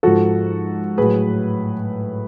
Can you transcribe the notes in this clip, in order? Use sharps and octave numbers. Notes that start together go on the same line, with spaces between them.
G#2 F3 F#4 A4
A2 F#3 G#4 B4